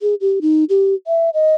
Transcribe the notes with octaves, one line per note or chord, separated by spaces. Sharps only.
G#4
G4
D#4
G4
E5
D#5